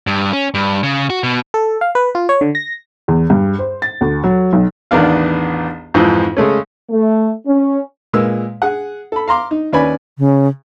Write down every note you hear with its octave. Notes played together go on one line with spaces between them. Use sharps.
G2
C#4
G2
C#3
F#4
B2
A4
F5
B4
F4
C#5
D3
A#6
E2
G2
C5
A6
D2
F#3
B1
A1 E2 D#3 B3 D4 F5
F2 G#2 E3 F3
C#3 G#3 A3 C#4
A3
C#4
A#2 G#3 A#4 B4 E6
G#4 F#5
A4 B5
F5 A#5 C6 D6
D#4
D#2 C#4 B4 D5 G#5 B5
C#3